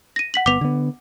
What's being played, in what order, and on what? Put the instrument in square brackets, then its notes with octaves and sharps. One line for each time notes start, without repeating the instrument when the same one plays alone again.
[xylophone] A#6 D#7
F#5 B6 F#7
[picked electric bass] G1 B3 [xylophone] D6 B6 F7
[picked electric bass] D3 B3